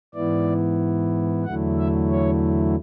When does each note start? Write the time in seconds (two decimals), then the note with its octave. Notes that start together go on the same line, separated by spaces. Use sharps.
0.15 G#2 E3 B3 E4 D5
1.45 E2 D3 F#3 A3 E4 F#5
1.78 E5
2.10 C#5